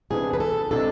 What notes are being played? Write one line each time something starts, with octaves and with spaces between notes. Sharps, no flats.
C3 E3 B3 D4 G#4
B4
A4
C3 E3 G#3 D4 A4